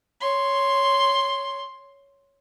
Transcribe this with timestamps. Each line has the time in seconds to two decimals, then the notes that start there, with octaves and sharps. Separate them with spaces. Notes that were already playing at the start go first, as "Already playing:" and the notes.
0.21 C#5 C6